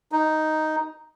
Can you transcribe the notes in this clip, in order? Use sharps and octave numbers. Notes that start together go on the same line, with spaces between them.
D#4